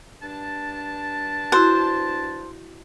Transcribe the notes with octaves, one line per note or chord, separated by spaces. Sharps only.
G2 D4 A5
E4 F#4 C5